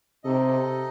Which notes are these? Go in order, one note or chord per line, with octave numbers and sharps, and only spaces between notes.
C3 D#4 A4 D#5